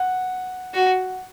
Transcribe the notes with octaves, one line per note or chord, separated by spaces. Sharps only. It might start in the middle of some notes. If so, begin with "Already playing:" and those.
Already playing: F#5
F#4